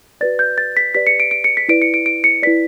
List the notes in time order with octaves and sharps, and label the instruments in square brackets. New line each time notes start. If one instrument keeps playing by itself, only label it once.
[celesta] F#4 B4 D5 A6
G6
A6
B6
G4 B4 D5 B6
C#7
D7
D7
C#7
B6
E4 B4 D5 D7
C#7
D7
D7
C#7
E4 B4 D5 B6